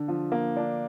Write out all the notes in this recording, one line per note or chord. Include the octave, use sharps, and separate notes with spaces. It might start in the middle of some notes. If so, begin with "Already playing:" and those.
Already playing: D3
F3
A#3
D4